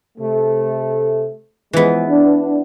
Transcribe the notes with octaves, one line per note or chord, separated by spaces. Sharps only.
C3 A3
E3 F3 G#3 B3
D4